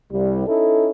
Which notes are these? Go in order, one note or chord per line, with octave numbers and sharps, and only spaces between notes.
C2 G3
C#4 D#4 E4 A4